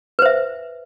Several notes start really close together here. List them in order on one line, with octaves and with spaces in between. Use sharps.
B4 C5 E5